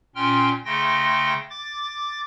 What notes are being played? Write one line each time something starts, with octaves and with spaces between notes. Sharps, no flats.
A#2 C#4 G5 C6 F6
C#3 A3 G5 C6 A#6
D6 A6